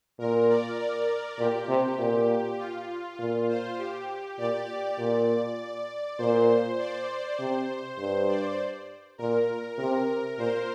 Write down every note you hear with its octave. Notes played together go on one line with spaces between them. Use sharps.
A#2 A#4
D5
A#4
A#2 G4
C3
A#2
F4
A#2 F4
C5
G4
A#2 D5
A#2
A#2 C5
D5
C3 C5
G2 C5
D5
A#2 A#4
C3 A#4
A#2 C5